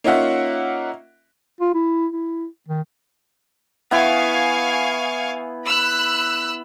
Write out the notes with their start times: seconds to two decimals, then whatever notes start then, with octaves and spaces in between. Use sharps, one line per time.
0.04 A#3 C#4 D#4 F4 E5 F#5
1.60 F4
1.75 E4
2.12 E4
2.68 D#3
3.91 B3 E4 F5 G#5 C#6
5.66 B5 E6 F#6